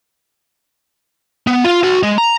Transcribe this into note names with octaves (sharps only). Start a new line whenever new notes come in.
B3
F4 F5
F#4 C6
G#3 D#5
A#5